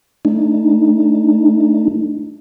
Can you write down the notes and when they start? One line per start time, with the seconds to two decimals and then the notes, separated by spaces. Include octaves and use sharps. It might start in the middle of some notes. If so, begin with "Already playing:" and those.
0.25 A3 D4 D#4